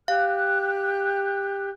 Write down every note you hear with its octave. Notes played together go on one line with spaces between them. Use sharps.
G4 F5 F#6